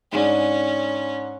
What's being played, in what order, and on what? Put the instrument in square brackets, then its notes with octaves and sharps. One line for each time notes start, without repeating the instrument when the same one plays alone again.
[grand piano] G#2 G#3 D4 [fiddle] C#4